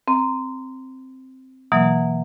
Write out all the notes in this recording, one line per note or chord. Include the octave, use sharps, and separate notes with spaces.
C4 A#5
B2 E3 F#3 A#3